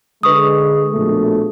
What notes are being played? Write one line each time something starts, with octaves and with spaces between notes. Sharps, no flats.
D3 G#3 B4 C#6 D#6
A#1 B2 A3